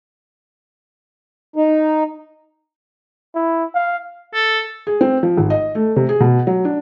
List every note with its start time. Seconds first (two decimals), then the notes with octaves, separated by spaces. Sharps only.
1.56 D#4
3.35 E4
3.75 F5
4.34 A4
4.87 G#4
5.01 C4
5.23 F3
5.37 G#1
5.50 D#5
5.75 A3
5.96 C3
6.09 G#4
6.21 B2
6.47 F#3
6.65 D4